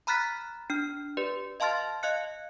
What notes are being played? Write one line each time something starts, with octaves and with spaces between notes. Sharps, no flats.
A#5 B5 F6 F#6 A6 B6
D4 F6
G4 B4 D5
D#5 F5 A5 C6 F6 A6
D#5 F5 F#6 C#7